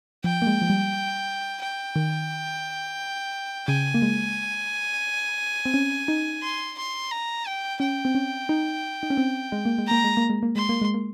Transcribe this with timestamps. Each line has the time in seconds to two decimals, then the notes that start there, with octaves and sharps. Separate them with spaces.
0.24 F3 G5
0.42 A#3
0.47 G#3
0.62 F3
0.70 G3
1.62 G5
1.96 D#3
3.68 C#3 G#5
3.94 A#3
4.02 G#3
5.65 C4
5.74 C#4
6.08 D#4
6.42 C6
6.78 C6
7.11 A#5
7.47 G5
7.80 C#4 G5
8.05 C4
8.15 C#4
8.49 D#4
9.03 D#4
9.10 C#4
9.17 C4
9.52 G#3
9.65 A#3
9.78 G#3
9.87 A#3 A#5
10.04 G#3
10.17 A#3
10.30 G#3
10.43 A#3
10.56 G#3 C6
10.69 A#3
10.82 G#3
10.94 A#3